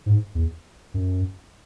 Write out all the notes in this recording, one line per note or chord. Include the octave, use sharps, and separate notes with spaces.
G#2
E2
F#2